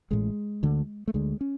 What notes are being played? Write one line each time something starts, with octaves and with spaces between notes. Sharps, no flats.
A1 A2 G#3
D2 D3
A3
D2 D3 G#3
C#4